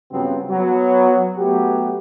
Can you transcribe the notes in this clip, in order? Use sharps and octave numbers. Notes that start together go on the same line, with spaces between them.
G2 C#3 F3 F#3 B3 C4
F#3 B3
F#3 A3 B3 G4